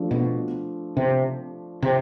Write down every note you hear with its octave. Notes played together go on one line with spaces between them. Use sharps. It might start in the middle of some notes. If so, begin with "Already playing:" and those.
Already playing: F3 A3 D4 F4
B2
C3
C3